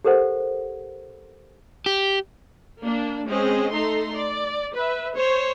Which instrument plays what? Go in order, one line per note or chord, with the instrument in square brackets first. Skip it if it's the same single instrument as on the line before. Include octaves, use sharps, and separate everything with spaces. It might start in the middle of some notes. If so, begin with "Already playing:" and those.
[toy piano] G4 A4 A#4 C5 F#5
[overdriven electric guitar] G4
[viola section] A#3 D4
G#3 C4 C#4 G#4 D#5
A3 D#4 A4 A#5 C6
D5
B4 E5
C5 C#5